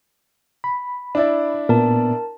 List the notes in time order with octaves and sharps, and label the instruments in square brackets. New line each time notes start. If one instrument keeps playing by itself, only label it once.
[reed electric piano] B5
[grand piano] D4 E4 D5
[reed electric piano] A#2 [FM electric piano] B3 [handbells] A#4 A5